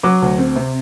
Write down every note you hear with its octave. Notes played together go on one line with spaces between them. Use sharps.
F#3 D6
D2
C4
C3